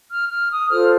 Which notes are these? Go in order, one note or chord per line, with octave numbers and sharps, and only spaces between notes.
F6
F6
D#6
F4 A4 C5 F6